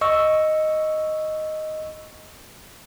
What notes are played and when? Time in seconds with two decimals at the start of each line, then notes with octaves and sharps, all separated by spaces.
0.01 D#5 C#6 E6